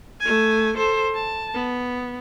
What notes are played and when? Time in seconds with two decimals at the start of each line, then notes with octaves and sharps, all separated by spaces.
0.21 A3 G#5
0.77 A4 C5
1.15 A5
1.54 B3